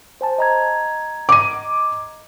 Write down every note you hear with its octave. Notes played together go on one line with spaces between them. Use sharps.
C5 G#5 A5
D#5 A#5 G#6
D6 D#7